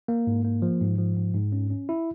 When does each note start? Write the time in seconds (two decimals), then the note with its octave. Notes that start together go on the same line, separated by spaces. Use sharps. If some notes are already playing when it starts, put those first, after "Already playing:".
0.08 A#3
0.27 G#2
0.45 A#3
0.62 F3
0.81 G#2
0.98 F3
1.17 G#2
1.34 G#2
1.52 C#4
1.70 C#4
1.89 E4